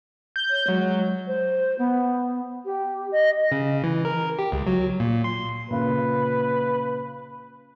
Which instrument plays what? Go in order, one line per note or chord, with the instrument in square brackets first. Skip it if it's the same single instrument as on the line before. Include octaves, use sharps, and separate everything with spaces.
[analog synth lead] G6
[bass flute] C#5
[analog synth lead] F#3 [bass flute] G#3
[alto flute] C5
B3
G4
D#5
[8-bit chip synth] C#3
E3
A#4
G4
C#2
F#3
A#2
C6
[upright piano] A#2 C#3 [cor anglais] B4